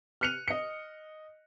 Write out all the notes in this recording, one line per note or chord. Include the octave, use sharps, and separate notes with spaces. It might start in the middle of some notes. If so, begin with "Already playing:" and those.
F6 F#6 C#7 D#7 F7
D#5 C#7